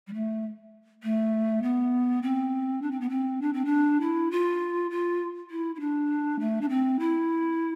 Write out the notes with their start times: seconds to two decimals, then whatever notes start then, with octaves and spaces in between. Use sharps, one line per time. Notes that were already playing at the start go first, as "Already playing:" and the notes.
0.07 G3
0.13 A3
1.03 A3
1.62 B3
2.22 C4
2.81 D4
2.91 C4
3.00 B3
3.09 C4
3.41 D4
3.53 C4
3.65 D4
4.00 E4
4.31 F4
4.90 F4
5.50 E4
5.75 E4
5.80 D4
6.39 A3
6.61 D4
6.69 C4
6.99 E4